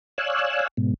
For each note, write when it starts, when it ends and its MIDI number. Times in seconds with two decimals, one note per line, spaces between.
0.18 0.67 73
0.18 0.67 74
0.18 0.67 77
0.18 0.67 80
0.18 0.67 88
0.18 0.67 90
0.77 0.94 44
0.77 0.94 47